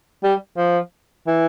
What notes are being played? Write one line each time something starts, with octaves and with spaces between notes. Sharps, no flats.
G3
F3
E3